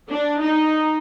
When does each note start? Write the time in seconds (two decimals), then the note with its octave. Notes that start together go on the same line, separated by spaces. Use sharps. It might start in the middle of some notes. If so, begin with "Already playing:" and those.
0.11 D4
0.42 D#4